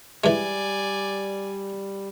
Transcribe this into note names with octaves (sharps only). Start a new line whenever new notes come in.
E3 G3 G#3 D5 G#5